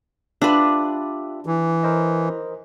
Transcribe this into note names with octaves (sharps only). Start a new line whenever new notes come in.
D4 F4 G4 B4 E5
E3
A#4 C5 D#5